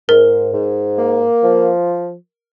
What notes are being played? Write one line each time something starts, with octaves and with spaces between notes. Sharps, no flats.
G#2 A#4
G#2
A#3
F3